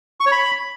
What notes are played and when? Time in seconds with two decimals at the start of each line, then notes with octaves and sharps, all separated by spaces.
0.20 C#6
0.26 C#5
0.32 B5